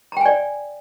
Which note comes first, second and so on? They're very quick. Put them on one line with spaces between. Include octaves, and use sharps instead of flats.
A#5 G5 G#5 D5